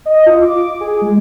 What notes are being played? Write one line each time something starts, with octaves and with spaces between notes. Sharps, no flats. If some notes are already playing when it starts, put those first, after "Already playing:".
D#5
F4
D6
G#4
G#3